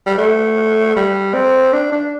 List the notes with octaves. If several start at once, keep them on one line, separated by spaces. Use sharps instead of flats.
G3
A3
G3
C4
D4
D4